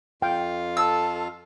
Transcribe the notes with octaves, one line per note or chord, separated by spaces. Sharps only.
F2 F4 F5 G5
A4 E6